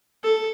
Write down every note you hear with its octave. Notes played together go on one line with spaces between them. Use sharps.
A4